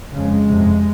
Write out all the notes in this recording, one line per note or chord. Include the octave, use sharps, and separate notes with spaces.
F2 C#3 G#3
F2 C3